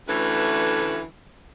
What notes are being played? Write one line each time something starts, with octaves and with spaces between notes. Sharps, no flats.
D2 E3 A3 C#4 B4 F#5